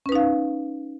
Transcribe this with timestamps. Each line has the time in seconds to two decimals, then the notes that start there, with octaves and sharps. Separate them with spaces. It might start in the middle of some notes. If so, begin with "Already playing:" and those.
0.06 C#4
0.09 B4
0.12 D#4
0.15 F5